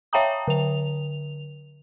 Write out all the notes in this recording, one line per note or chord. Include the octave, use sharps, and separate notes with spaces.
C#5 E5 G5 A5 A#5 D#6
D3 F7